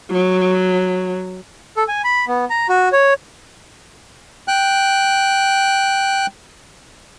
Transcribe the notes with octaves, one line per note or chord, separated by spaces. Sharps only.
F#3
A4
G#5
B5
B3
A#5
F#4
C#5
G5 F#6